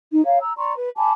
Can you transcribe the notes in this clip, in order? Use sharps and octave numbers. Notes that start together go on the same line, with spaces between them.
D#4
C#5 F5 A#5
A#5 E6
D5 A#5 C6 C#6
B4
G#5 A5 B5 D6